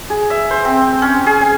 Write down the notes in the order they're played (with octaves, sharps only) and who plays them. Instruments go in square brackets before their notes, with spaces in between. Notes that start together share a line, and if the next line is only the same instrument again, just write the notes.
[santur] G#4
E5
C5
C4
C#4
G#4
G#5